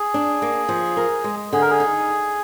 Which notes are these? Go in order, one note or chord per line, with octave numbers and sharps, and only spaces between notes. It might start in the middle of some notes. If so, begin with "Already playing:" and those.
Already playing: G#4
D4
A#3
F3
A#4
G#3
D3 G#4
A#4
G#4
D#4